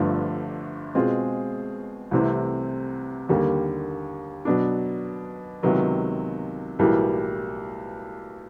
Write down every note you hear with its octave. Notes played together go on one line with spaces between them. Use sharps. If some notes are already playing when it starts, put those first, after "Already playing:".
Already playing: G1 G2 D3 F3 A3
B2 G#3 C4 F4 G#4
C2 C3 E3 A3 C4
D#2 D3 G3 A#3
B2 F#3 B3 D4
C#2 C3 D#3 F#3 B3
B1 A2 E3 G3 A#3